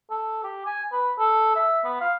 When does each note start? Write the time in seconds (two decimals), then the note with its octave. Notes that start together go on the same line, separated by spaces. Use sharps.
0.11 A4
0.44 G4
0.66 G#5
0.92 B4
1.19 A4
1.56 E5
1.85 B3
2.01 F5